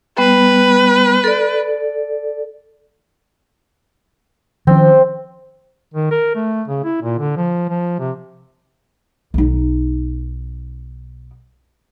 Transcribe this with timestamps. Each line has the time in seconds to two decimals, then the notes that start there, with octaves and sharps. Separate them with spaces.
0.18 G3 B3 B4
1.24 A4 D5
4.67 D#3 F3 C4 C#4
5.94 D#3
6.11 A#4
6.35 A3
6.68 C#3
6.84 E4
7.02 A#2
7.19 D3
7.37 F3
7.69 F3
8.00 C3
9.34 B1 D#4